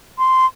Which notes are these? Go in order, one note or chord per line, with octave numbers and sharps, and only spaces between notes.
C6